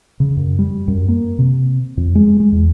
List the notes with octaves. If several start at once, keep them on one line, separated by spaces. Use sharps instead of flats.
C#3
F#2
G3
F#2
A#3
C3
F2
G#3
G#3
E2